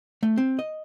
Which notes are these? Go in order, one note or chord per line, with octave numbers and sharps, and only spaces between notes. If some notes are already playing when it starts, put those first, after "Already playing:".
A3
C4
D#5